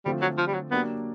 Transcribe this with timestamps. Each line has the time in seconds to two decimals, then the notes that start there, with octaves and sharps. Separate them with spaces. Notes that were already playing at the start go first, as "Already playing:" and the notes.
0.05 D3 F3 G3 A3 C4 F4
0.22 F#3
0.38 F3
0.47 G3
0.54 F#3
0.71 F#3 A#3 B3 D4 G4